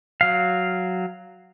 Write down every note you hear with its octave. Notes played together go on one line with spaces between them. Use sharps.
F#3 F5